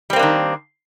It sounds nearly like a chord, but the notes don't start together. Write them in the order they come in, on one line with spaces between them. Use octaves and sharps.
G3 C4 A#3 D4 D#3